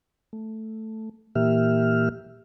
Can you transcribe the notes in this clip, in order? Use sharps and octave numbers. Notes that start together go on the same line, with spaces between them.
A3
A#2 E3 A#3 G4 E5 F6